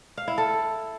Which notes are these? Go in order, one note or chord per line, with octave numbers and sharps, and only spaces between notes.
F5
E4
A4